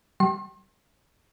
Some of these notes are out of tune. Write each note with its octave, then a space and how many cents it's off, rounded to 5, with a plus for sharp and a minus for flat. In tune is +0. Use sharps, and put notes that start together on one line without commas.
G3 -35 C6 +45